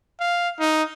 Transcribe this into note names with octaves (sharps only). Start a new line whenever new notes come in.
F5
D#4